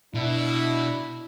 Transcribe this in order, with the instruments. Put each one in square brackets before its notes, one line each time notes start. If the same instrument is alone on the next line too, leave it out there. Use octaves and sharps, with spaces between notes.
[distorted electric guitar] B2 [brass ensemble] D4 E4